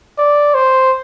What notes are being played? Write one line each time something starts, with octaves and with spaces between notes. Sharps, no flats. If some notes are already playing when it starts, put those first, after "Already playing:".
D5
C5